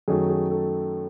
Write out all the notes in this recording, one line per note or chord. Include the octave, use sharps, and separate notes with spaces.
F#2 D#3 F#3 A3 G#4
G#4
A4